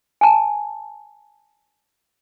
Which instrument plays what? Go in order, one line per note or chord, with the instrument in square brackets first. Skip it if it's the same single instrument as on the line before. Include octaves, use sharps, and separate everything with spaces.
[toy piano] G#5 A5